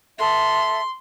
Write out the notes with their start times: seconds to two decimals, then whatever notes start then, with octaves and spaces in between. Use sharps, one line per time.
0.18 A4 E5 C6